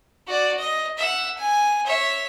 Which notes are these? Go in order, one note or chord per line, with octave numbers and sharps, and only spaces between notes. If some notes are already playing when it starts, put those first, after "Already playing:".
F#4 D5
D#5
E5 F#5
G#5
C#5 E5